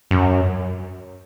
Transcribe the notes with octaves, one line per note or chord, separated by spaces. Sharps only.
F#2